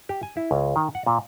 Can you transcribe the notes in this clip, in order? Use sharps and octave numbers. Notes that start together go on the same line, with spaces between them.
G4
G#5
E4
C#2
D#3
F#5
A#2